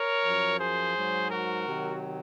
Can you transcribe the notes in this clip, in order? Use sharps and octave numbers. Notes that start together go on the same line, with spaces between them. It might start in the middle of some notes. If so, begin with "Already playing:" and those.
Already playing: A#4 C#5
F#2 F3
G#4 C5
G#2 F#3
F#4 A#4
C3 D#3 F#3